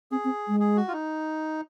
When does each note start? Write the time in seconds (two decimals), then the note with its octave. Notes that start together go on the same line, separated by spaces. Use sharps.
0.11 C4 G#4
0.24 C4
0.48 G#3
0.60 G#4
0.76 F#4
0.88 F4
0.93 D#4